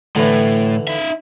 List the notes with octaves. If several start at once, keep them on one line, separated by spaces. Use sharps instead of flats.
A2 D3 E3
D#4 E5